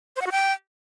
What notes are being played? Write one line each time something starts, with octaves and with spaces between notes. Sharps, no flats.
C5
F#5
F#4
G5